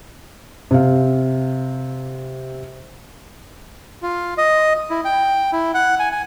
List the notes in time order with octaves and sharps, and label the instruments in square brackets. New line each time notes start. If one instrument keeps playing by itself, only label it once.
[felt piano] C3 F5
[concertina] F4
D#5
E4
G5
E4
F#5
G#5
G#5